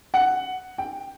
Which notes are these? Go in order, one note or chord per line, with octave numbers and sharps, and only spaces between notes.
F#5
G5